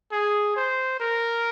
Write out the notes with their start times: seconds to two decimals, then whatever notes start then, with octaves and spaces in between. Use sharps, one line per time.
0.12 G#4
0.56 C5
1.00 A#4